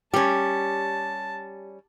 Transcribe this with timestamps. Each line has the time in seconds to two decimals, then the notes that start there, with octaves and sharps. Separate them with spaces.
0.14 G3 C#4 G4 A5